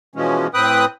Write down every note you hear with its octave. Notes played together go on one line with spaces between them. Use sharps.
B2 E3 F3 G#3 C#4
A2 C4 B4 G5 D#6 F#6